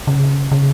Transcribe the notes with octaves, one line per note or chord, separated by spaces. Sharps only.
C#3
C#3